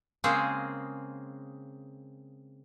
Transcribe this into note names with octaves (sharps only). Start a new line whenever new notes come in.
C#3 G#3 A#3 C4 G#4